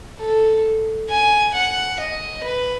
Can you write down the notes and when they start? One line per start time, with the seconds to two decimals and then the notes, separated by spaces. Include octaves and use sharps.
0.20 A4
1.09 G#5
1.54 F#5
1.99 D#5
2.43 B4